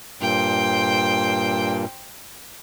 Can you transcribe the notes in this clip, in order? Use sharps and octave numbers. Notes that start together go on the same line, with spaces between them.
G2 A#2 C5 G5